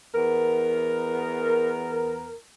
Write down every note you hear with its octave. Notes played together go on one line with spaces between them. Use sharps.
E2 B3 A#4